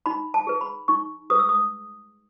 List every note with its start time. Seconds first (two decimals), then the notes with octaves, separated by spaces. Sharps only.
0.06 D#4 B5
0.34 A5
0.47 G#4 B4
0.61 B5
0.88 D#4 C#6
1.30 G#4 B4 D#6
1.39 E6
1.49 D#6